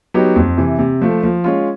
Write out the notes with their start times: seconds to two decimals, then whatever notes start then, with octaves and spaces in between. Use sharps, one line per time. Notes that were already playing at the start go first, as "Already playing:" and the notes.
0.14 F#3 B3 D#4 G4
0.36 F2
0.57 C3 E3
0.79 C3
1.02 F3 A3
1.23 F3
1.44 G#3 C#4 F4